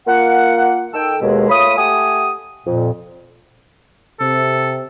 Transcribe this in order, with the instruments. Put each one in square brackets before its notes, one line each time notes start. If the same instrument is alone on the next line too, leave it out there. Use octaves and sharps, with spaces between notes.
[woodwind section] A#3 F4 F#5
D#3 A4 G5 E6
D#2 B2 G#3 G#4
A3 F4 C#5 B5 D#6
A3 G4 F#5 G#5 D#6
F2 A#2
[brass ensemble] C3 [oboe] A4